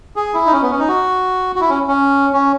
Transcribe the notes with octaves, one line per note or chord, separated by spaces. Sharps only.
G#4
E4
D#4
C#4
B3
C#4
D#4
F#4
F#4
E4
C#4
C#4
C#4